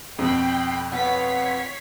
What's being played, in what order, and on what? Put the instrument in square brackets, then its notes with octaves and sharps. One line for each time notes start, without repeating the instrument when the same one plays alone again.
[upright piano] F2 B2 [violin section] G5 B5 C7
[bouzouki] B3 F4 [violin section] C#5 B6 C7